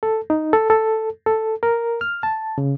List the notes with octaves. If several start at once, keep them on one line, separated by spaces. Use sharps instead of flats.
A4
D#4
A4
A4
A4
A#4
F6
A5
C#3